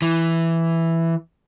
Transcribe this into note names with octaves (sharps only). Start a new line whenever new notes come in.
E3